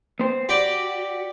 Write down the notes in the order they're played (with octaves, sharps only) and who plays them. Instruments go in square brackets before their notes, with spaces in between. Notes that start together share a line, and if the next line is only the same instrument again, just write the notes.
[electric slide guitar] B3 C5
[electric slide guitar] F#4 [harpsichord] G4 D5 B5